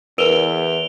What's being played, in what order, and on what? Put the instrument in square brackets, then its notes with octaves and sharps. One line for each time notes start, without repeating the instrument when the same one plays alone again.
[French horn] E2 [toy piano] A#4 B4 [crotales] D7 F7 G7